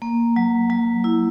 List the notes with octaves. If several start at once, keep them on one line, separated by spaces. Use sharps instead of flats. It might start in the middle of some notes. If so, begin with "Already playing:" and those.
A#3
F#3
F#3
E4